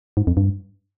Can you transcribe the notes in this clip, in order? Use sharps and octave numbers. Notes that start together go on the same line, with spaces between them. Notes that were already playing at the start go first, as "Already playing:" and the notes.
G#2
F2
G2